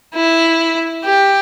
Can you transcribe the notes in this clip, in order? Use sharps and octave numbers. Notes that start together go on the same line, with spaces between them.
E4
G4